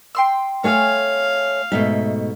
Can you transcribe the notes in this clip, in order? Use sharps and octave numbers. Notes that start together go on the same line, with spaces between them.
G5 C6 E6
A3 C#5 F5 G#5
G#2 B2 A3 E5